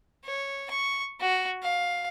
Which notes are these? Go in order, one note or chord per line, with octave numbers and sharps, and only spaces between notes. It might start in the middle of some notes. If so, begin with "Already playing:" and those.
C#5
C#6
F#4
F5